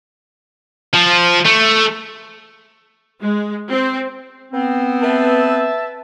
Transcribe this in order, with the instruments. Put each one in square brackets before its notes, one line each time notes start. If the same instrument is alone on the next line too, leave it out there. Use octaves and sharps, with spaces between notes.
[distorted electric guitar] F3
A3
[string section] G#3
C4
[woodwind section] B3 C4
[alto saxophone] B4 [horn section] E5 A5